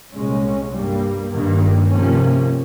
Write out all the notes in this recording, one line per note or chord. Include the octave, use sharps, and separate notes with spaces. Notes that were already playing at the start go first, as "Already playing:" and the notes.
C2 A#2 G#3 C#4
G2 G3 A#3
G2 D#3 A#3
C3 F3 A#3 C#4